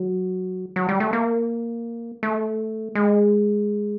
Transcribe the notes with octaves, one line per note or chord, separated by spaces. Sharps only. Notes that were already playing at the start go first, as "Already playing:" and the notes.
Already playing: F#3
F#3
G3
A3
A#3
A3
G#3